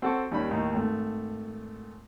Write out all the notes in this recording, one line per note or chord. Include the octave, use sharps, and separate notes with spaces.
C4 F#4 A4 F#5 A5 C#6
D#2 G3 C#4 D4 B5
D#2 A2 D#3 D#4
G#1 A3